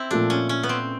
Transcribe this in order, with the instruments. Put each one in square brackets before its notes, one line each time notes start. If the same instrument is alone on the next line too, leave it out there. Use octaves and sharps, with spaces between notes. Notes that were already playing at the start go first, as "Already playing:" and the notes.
Already playing: [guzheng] C4 E4
[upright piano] A#2 F3 A3 [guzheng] D4
[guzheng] C#4
C#4
B3
C4